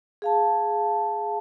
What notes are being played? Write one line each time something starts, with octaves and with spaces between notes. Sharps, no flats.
G#4 F5 A5